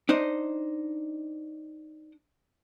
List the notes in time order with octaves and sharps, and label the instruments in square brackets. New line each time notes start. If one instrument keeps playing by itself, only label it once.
[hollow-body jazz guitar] D4 D#4 C5 D#5